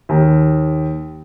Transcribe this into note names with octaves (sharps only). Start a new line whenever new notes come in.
D#2